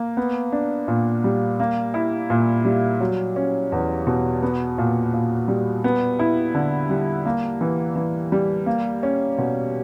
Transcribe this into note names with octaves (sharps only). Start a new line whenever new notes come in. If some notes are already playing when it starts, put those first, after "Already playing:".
Already playing: A#3
B3
D4
A#2
G3
A#3
E4
A#2
G3
F#3
C#4
E2
B2
B3
A#2
A#2
G3
B3
E4
D3
G3
A#3
E3
E3
G3
A#3
C#4
B2